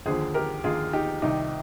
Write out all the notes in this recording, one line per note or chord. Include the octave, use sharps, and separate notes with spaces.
D#2 D3 F3 G#4 C5
G4 A#4
D#2 D3 F3 F4 G#4
D#4 G4
C2 C3 D#3 D#4 G4